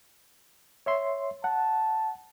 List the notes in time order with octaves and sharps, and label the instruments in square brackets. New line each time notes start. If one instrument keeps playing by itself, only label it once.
[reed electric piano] C#5 E5 C6
[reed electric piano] F#5 [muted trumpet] A5